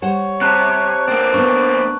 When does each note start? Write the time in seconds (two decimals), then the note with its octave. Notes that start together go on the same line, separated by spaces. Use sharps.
0.02 G3 C5 C#5 F#5
0.41 C3 A5 A#5 F#6
1.07 A#3 C4 D5
1.34 B3 D4 C#6